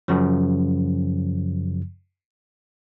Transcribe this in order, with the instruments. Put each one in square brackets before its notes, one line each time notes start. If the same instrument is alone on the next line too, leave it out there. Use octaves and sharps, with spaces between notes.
[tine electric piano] F#2 C#3 F3